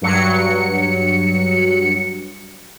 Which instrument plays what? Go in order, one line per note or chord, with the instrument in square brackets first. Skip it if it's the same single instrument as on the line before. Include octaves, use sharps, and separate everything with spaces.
[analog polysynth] G2 F#3 C#7